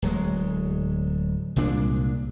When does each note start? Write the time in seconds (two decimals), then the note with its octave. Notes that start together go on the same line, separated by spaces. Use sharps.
0.02 D1 F#3 G#3
1.56 C2 A#2 G#3 D4